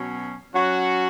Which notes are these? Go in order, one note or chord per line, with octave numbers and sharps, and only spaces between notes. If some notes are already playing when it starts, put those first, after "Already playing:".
Already playing: B2 F#3 C#4
F#3 C#4 F#4